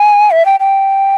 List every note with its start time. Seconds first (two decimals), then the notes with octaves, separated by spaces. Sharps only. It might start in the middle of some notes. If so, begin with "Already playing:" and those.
Already playing: G#5
0.31 E5
0.46 G5
0.60 G5